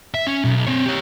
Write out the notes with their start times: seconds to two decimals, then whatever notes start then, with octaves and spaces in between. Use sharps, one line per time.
0.14 E5
0.27 C#4
0.45 B1
0.67 C4 C#5
0.86 G4 C#5